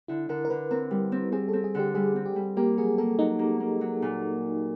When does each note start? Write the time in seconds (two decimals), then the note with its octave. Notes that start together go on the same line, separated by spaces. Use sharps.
0.08 D3 E4
0.29 D3 A#4
0.45 A#4
0.50 D3 B4
0.71 C4 A#4
0.91 G3
1.12 C4
1.32 C4 G#4
1.49 C4 A4
1.64 G#4
1.75 D3 G4
1.95 G3 G#4
2.16 C4
2.26 G4
2.36 G3
2.57 A#3 G4
2.77 F#3 G#4
2.98 A#3 A4
3.19 F#3 D#4
3.39 A#3
3.60 A#3
3.81 F#3
4.02 A#2